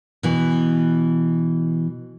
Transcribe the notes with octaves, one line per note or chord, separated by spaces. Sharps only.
B2 E3